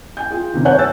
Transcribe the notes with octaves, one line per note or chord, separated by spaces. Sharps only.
G5 G#5 G6
F4 G#4
G2 C3 D#3
B4 C#5 F#5 A5 F#6 G6
F5 G5 G#5 E6 F#6 A6